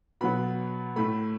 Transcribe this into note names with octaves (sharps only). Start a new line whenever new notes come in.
B2 F#3 B3 B5
A2 A3 B5